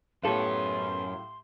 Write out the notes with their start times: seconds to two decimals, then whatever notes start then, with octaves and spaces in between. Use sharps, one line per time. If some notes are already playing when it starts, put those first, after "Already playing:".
0.23 F#2 A2 B3 G4 A4 C#5 F5 C6